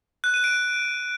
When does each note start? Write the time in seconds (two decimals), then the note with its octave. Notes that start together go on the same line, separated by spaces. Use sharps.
0.24 F#6
0.34 D#7
0.44 D7